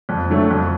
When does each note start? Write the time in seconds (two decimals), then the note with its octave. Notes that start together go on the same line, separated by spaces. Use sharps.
0.09 F2
0.30 D3 F#3 A3
0.50 F2